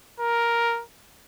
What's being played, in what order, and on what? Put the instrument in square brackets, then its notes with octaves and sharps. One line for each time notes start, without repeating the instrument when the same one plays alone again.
[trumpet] A#4